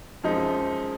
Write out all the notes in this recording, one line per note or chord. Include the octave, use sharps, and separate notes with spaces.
F#2 F3 G#3 D#4